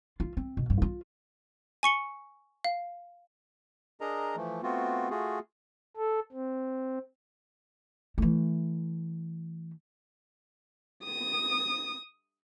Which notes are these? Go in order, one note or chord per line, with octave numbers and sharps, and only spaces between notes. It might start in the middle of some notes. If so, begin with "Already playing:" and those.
F4
C4
B2
G2
F4
G#5 C#6 C#7 G7
F5
D4 G#4 A#4 D#5 A#5
E3 F3 A3
A3 B3 C4 F4 F#4
A3 F4 F#4 G#4
A4
C4
E3 A3
D#6